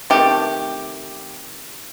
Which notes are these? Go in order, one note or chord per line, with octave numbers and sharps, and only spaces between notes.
C3 D#3 A3 G4